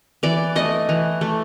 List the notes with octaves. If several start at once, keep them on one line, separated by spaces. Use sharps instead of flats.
E3 D5
A3 D#5
E3
A3